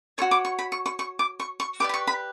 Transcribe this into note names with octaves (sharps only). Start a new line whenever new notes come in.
F#4 A4 C#5 C#6
D6
C#6
B5
C#6
C#6
C#6
D6
C#6
C#6
G4 B4 D5 D6
B5
C#6
B5